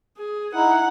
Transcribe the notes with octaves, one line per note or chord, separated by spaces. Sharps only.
G#4
D#4 E4 F#5